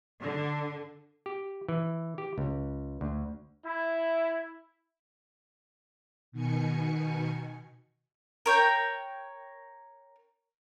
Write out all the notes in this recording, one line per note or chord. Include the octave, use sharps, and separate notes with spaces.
D3
G4
E3
G4
C#2
D2
E4
B2 D#3 G#5 C#7
A#4 C#5 G5